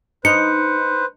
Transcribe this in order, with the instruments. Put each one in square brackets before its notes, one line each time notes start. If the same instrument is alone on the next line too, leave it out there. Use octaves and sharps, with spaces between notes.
[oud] D#4 [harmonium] B4 C5 [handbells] C#7